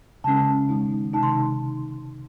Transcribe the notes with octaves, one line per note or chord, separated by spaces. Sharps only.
C#3 G#3 C#4 A5
D#3 G#3 D#4
C3 D#3 G#3 D#4 A5
C6